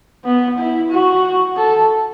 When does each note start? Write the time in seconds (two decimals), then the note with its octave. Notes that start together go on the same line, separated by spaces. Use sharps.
0.24 B3
0.58 E4
0.90 F#4
1.56 A4